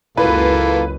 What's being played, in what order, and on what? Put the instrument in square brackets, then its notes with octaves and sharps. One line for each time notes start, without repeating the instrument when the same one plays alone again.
[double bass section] F#1 C#2 F#2 [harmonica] A#3 F4 A4 [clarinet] E4 [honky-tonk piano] B4